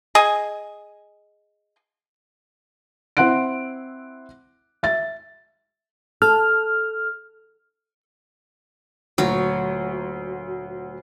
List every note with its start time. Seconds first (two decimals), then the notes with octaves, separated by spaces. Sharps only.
0.15 G#4 D#5 G#5
3.17 C4 E4 F#5 C6 F#6 D7
4.83 E5 A6
6.22 A4 F6
9.18 D2 A#2 F#3